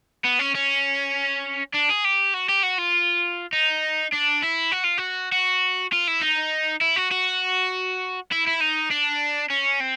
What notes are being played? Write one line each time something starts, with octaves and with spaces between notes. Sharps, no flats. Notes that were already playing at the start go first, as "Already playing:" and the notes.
B3
C#4
C#4
D4
G#4
G4
F#4
G4
F#4
F4
D#4
D4
E4
F#4
F4
F#4
F#4
F4
E4
D#4
E4
F#4
F#4
E4
E4
D#4
D4
C#4
C4